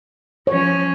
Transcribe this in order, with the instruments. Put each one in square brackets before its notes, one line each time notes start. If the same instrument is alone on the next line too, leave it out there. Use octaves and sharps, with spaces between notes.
[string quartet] F3 C#4 [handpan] C#5